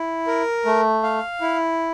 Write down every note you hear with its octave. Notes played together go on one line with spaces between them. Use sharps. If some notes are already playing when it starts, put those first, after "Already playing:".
Already playing: E4
A#4
A3
F5
E4